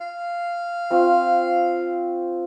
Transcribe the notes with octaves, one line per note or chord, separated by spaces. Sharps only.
F5
C4 F4 C#6